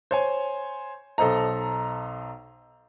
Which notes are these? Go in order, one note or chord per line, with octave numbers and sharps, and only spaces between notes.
C5 C#5 G#5
B1 A4 C5 D#5 A#5